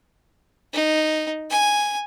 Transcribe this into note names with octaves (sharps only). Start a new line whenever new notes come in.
D#4
G#5